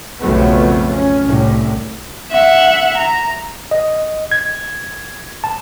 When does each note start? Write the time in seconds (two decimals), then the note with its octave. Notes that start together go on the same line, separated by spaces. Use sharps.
0.20 B1 F2 C#3 F#3 A3 B3
0.91 C#4
1.25 C2 A2
2.32 E5 F#5
2.97 A#5
3.71 D#5
4.32 G#6
5.44 A5